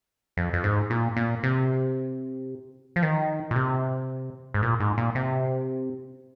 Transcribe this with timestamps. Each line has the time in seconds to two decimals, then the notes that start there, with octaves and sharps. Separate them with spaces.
0.37 F2
0.53 F2
0.64 G#2
0.90 A#2
1.17 A#2
1.43 C3
2.96 F3
3.03 D#3
3.51 A#2
3.56 C3
4.54 G#2
4.62 A#2
4.80 G#2
4.98 A#2
5.15 C3